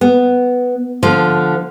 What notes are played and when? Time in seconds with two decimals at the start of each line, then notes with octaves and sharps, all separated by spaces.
0.01 B3
1.03 D3 F3 C5